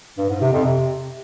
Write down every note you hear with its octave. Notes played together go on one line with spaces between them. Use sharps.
G2
G#2
C3
F2
C3